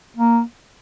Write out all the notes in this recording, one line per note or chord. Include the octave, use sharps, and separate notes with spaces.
A#3